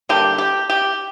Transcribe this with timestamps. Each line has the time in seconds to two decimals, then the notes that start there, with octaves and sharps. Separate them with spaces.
0.09 D3 G3 A#3 G4
0.38 G4
0.70 G4